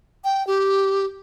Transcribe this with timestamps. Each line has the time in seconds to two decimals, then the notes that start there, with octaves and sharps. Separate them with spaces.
0.24 G5
0.47 G4